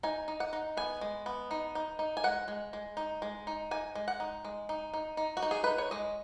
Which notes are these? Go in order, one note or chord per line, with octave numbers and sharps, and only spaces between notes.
D#4 G#5
D#4
F#5
D#4
B3 G#5
G#3
B3
D#4
D#4
D#4
G#5
G#3 F#5
G#3
G#3
D#4
G#3
D#4
D#4 G#5
G#3
F#5
D#4
G#3
D#4
D#4
D#4
F#4
D#4
G#4
D#4 B4
C#5
G#3 D#5